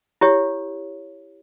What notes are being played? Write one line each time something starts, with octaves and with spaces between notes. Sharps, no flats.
E4 G4 C#5